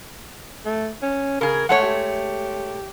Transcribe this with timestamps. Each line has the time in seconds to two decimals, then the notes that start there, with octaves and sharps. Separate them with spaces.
0.66 A3
1.03 C#4
1.41 C#3 G#4 A#4
1.69 G#3 A3 C#5 F#5
1.82 G4